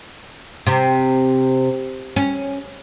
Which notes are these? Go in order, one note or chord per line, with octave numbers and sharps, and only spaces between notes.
C3
C#4